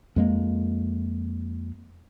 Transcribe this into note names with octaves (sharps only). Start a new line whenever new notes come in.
F2 G#3 A#3